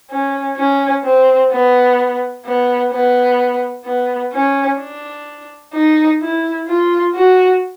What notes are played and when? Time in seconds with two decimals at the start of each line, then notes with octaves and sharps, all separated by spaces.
0.11 C#4
0.57 C#4
1.04 C4
1.51 B3
2.46 B3
2.92 B3
3.85 B3
4.33 C#4
4.79 D4
5.74 D#4
6.21 E4
6.67 F4
7.15 F#4